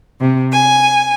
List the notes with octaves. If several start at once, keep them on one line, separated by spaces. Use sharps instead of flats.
C3
G#5